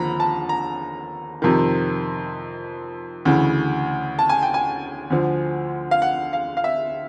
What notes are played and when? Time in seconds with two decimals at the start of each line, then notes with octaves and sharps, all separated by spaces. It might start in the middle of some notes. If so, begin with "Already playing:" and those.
Already playing: D#2 D3 F3 A#5 B5
0.20 A5
0.49 A#5
1.42 F2 C3 D#3
3.25 D2 C#3 E3
4.19 A5
4.29 G#5
4.43 G5
4.54 G#5
5.10 D2 D3 F3
5.91 F5
6.02 F#5
6.33 F5
6.57 F5
6.64 E5